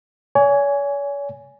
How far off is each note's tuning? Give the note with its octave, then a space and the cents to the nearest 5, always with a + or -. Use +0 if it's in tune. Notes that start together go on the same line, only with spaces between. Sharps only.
C#5 +40 G#5 +0